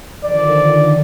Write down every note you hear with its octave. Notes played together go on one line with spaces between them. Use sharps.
D3 D#3 F3 D5